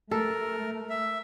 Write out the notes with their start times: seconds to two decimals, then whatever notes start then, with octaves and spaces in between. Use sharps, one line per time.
0.11 A3 A4 A#4
0.90 E5